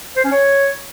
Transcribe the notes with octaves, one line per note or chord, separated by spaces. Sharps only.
C5
C#4
C#5